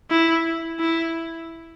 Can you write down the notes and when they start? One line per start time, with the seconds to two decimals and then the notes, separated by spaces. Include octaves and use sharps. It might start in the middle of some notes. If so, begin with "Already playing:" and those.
0.10 E4
0.80 E4